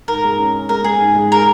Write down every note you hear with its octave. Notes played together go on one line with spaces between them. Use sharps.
G#2 A#4
G#3
C#4
C#4
G#3 A#4
G#3 G#4
G#2
G#3
G#4 A#4